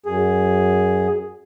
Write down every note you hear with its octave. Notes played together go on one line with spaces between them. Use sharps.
F#2 G#4